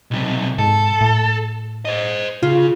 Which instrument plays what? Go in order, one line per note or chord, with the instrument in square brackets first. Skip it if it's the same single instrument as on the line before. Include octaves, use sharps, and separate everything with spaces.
[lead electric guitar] B1 C3
[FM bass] G#2 [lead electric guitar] A4
[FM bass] A2
[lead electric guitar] C5 D#5
[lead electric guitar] C#3 [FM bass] F4